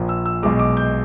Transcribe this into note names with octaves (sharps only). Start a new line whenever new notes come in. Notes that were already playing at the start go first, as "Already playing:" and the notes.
Already playing: A#1 A#2 F3
E6
E6
B1 B2 G#3 D6
D6
G6